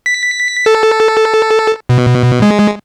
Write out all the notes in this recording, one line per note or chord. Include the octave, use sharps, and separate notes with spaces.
B6
A4
B2
G#3